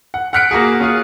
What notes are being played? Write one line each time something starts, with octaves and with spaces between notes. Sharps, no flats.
F#5
F#5 F6 F#6 B6 C#7 D7
A#3 F#4 G#4
C#4 F4 G#4